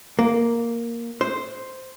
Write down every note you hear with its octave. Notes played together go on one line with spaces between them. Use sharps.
A#3
C5